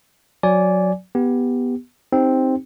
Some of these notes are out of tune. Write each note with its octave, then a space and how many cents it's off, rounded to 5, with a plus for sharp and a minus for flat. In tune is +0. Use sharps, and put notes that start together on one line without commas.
F#3 -15 D5 -15 G#5 +0
B3 -5 G4 +10
C4 +0 D#4 +0 G4 +15